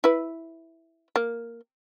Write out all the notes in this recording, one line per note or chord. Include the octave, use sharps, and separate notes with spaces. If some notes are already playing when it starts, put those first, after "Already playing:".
E4 B4
A#3